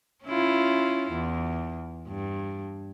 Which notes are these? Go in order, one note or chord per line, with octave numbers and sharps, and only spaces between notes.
C#4 E4 F4
E2
G2